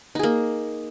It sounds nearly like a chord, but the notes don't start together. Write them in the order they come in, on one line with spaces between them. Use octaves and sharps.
D#4 G#4 A#3